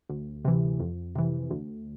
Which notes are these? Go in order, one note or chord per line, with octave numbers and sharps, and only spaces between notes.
D2
C3 E3
F2
C3 E3
D2